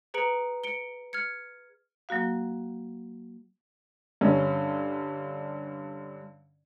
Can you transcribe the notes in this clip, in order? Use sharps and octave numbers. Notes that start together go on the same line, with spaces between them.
G#4 B4 A#5 C#7 D7 F#7
C#7 D7 G7
F6 G#6 C#7
F#3 A#3 F#4 F5
G2 D3 C#4